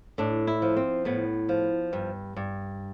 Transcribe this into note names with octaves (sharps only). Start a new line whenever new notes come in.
A2 D4
E4
F3
C4
A2 B3
F3
G2
G2